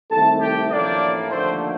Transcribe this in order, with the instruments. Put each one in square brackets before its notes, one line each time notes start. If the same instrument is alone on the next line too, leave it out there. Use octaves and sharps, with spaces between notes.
[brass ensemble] C2 C3 D#3 A3 A4 A5
G4 G5
A1 A2 F3 A#3 D4 D5
D#2 D3 F3 A3 C4 C5